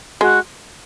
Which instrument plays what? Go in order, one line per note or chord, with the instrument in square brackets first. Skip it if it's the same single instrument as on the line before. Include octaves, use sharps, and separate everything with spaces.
[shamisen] G#3 [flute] F#4